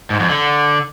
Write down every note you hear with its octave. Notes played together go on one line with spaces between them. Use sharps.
G#2
F2
D3